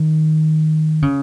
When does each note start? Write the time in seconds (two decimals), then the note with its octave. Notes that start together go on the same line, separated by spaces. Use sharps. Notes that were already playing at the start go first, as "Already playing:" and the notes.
Already playing: D#3
1.02 C#3